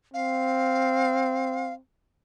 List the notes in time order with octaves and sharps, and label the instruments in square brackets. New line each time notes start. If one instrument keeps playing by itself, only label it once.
[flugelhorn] C4 [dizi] F5